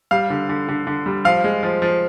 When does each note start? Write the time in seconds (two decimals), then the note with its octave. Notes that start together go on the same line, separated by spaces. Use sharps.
0.11 G3 F5
0.30 D3
0.49 D3
0.68 D3
0.87 D3
1.06 G3
1.25 F3 F5
1.44 G#3
1.63 F3
1.82 F3